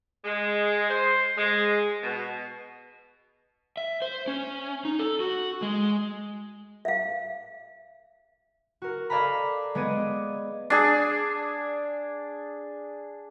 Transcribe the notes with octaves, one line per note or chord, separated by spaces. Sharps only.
G#3
C5
G#3
B2
E5
C5
C#4
D#4
A4
F#4
G#3
E5 F5
F#4 A#4
A4 D5 F5 G#5 A#5 B5
G#3 B3 G#4 D5 D#7
D4 G#4